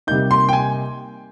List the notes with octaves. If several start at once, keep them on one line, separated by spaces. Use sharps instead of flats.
C3 G3 A#3 D#4 G6
C6
G5
G#5